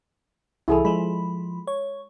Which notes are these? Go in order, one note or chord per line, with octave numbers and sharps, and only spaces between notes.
C2 E3 E4 G#4 A4
F3 G#3 B5
C#5